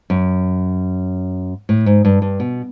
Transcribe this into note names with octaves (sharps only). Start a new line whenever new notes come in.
F#2
A2
G#2
G2
G2
B2